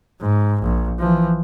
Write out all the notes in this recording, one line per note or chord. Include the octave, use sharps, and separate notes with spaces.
G#2
A#1
E3 F3